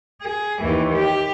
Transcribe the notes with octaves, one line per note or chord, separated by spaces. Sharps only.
G#4
D#2 E3
G4